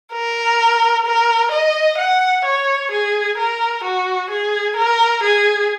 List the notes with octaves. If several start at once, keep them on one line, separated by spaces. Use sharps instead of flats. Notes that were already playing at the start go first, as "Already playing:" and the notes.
A#4
A#4
D#5
F#5
C#5
G#4
A#4
F#4
G#4
A#4
G#4